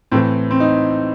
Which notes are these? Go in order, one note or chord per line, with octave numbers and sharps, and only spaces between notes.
A2 E3 C4
C4
D#4